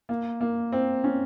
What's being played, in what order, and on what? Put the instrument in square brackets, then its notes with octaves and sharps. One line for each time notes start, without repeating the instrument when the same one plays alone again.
[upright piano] A#3
A#3
C4
C#4